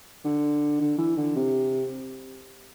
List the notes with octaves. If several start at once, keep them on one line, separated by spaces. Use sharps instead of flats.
D3
D3
E3
D3
C3